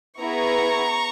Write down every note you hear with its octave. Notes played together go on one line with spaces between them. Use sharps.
B3 E4 G#4 A#5 C#6